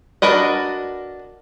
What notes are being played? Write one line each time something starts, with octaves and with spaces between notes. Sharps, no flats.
D4 F#4 A#4 B4 D#5